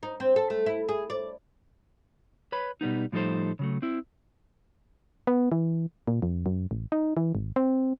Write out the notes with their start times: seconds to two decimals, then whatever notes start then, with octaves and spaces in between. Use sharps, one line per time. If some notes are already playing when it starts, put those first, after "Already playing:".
0.03 D#4
0.20 C4
0.36 A4
0.50 A3
0.66 E4
0.89 G#4
1.10 D5
2.52 B4 C#5 B5
2.81 B2 G3 B3 D#4
3.12 A2 F3 G3 D#4 A4 C5
3.59 C#3 F#3 A3
3.82 C4 E4
5.27 B3
5.52 E3
6.07 A#2
6.22 F2
6.46 F#2
6.71 A1
6.92 D#4
7.17 E3
7.35 G#1
7.56 C4